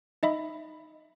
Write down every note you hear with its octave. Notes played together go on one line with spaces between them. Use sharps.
D#4 D#5 E5 B5